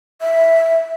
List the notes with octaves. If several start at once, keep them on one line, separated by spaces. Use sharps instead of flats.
E5